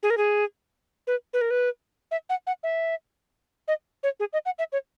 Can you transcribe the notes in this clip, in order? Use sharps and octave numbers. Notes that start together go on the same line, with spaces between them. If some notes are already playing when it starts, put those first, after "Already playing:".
G#4
A#4
G#4
B4
B4
A#4
B4
E5
F#5
F#5
E5
D#5
C#5
G#4
D#5
F#5
E5
C#5